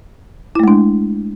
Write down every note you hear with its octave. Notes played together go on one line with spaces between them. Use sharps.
G#3 A3 D4 E4